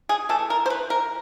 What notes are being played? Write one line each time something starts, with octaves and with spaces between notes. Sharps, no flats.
G#4
E3 A3 A4
A#4
C5
B4
A#4